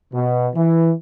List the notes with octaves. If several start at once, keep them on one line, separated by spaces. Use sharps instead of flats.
B2
E3